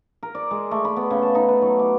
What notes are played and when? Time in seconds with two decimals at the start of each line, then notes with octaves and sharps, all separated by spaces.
0.23 A#4
0.35 D5
0.51 G#3
0.71 A3
0.85 B5
0.96 B3
1.10 C#3
1.22 A5
1.35 D#4
1.49 B4
1.62 F#3
1.79 D6